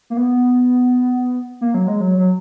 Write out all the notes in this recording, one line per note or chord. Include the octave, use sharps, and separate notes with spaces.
A#3
B3
A#3
F#3
G#3
F#3
F#3